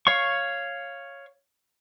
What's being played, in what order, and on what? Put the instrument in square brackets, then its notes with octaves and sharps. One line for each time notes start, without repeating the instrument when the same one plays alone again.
[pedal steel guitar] C#5 F5 C#6